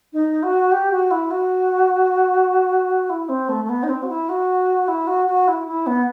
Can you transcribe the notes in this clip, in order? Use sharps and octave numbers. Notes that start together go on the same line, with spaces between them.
D#4
F#4
G4
F#4
E4
F#4
E4
C4
A3
A3
B3
D#4
C4
F#4
E4
F#4
E4
F#4
F#4
E4
E4
B3